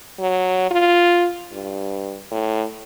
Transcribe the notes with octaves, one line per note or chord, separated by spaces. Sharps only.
F#3
F4
G2
A2